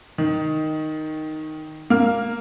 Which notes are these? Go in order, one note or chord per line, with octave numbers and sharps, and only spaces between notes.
D#3
A#3 F6